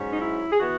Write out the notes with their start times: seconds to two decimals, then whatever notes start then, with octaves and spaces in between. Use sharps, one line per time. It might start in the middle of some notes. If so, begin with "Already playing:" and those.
Already playing: G#2 F#3 C#4
0.12 D#4
0.20 E4
0.52 G#4
0.59 E3 B3 F#4